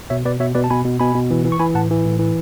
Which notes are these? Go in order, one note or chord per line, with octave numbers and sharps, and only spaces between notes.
B2 C#5 E5
B2 B4 D5
B2 C#5 E5
B2 B4 D5
A5
B2 G#5 B5
B2
B2 G#5 B5
B2
E3
E3
C#6
E3 G#5 B5
A2 F#5 A5
E3
A2
E3